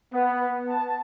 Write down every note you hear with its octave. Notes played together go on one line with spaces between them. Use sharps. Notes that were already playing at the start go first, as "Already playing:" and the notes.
B3
A5